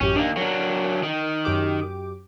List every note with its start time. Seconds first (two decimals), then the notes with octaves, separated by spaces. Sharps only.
0.01 A1 F#2 C#4 G4
0.16 D#3 A#3 D4
0.37 F#3 D4 A#4
1.03 D#3
1.45 F#2 G4 D6